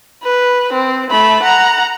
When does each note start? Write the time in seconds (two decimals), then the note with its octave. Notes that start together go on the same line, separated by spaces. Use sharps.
0.24 B4
0.73 C4
1.10 A3 B5
1.43 F#5 A#5